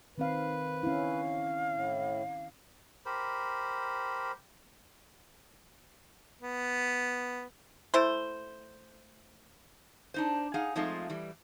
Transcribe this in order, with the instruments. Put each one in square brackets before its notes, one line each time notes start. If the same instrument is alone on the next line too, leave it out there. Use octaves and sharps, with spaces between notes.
[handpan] D#3 C4 F5 [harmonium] B4
[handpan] C#4 E4 [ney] F5
[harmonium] A2
[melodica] G4 A#4 C5 B5
[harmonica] B3
[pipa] A3 E4 C5
[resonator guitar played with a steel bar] D4 D#4 C5
D#4 G#4 F5 F#5 G#5
F3 G#3 A3 C4 D#4 F4
E3 G3